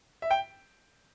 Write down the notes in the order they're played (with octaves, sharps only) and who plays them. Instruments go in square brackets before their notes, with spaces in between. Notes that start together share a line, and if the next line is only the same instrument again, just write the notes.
[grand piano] E5
G5